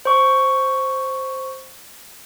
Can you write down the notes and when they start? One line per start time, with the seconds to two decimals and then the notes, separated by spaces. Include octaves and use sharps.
0.05 C5 C#6